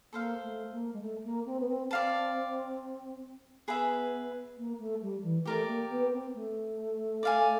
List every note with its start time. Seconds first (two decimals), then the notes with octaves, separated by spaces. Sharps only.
0.13 A#3 A4 C5 F5
0.42 A3
0.72 A#3
0.93 G#3
1.01 A3
1.24 A#3
1.46 C4
1.60 B3
1.68 C4
1.90 C4 D5 F5 A5
3.67 B3 G#4 B4 E5
4.57 A#3
4.79 A3
5.02 G3
5.23 E3
5.45 A3 G4 A#4 D5
5.67 A#3
5.89 B3
6.12 C4
6.34 A3
7.23 D5 F5 G#5